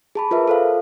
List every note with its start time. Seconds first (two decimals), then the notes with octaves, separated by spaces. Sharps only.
0.15 G#4 A5 B5
0.31 F4 A#4 B4 E5
0.48 A4 C5 F5